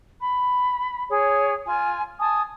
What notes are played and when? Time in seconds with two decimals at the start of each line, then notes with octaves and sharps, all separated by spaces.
0.20 B5
1.09 G#4 C#5
1.65 F4 G#5
2.19 G#5 A5 D#6